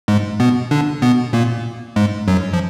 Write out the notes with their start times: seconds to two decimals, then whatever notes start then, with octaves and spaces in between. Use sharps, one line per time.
0.08 G#2 G#3
0.40 B2 B3
0.71 D3 D4
1.02 B2 B3
1.33 A#2 A#3
1.96 G#2 G#3
2.28 F#2 F#3
2.53 F3